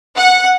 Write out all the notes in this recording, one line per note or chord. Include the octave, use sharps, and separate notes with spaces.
F#5